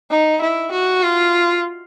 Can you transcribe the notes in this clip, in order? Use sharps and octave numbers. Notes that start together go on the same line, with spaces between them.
D#4
E4
F#4
F4